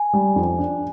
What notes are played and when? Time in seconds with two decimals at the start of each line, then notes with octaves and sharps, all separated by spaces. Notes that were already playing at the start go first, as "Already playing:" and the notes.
Already playing: G#5
0.13 G3
0.36 F2
0.58 D4